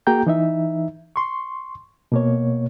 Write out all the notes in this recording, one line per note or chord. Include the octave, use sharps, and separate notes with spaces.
A#3 F#4 G#4 G5 A#5 G6
E3 D#4 E5
C6 C#6
B2 A#3 C#5